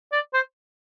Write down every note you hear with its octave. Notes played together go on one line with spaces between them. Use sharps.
D5
C5